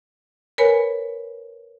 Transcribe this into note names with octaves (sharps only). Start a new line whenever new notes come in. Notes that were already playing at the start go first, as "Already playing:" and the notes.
A#4 B4 C#5 G#5 B5